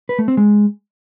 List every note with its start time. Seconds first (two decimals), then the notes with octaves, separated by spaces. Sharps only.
0.09 B4
0.19 A3
0.28 C4
0.37 G#3